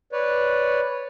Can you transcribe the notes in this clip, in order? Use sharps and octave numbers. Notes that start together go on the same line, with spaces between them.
B4 C#5 D5